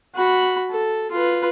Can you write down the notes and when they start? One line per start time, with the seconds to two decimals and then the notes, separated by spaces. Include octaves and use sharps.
0.15 F#4 B5
0.71 A4
1.11 F4 B4